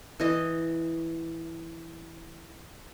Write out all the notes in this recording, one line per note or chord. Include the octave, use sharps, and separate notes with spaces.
E3 D#5